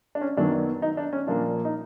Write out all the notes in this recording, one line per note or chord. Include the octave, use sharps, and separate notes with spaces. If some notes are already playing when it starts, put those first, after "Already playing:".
D4
C#4
F#2 D#3 F#3 B3 D4
D#4
D4
C#4
A#2 F3 A#3 D4
D#4